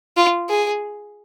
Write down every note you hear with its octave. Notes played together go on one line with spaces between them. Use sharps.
F4
G#4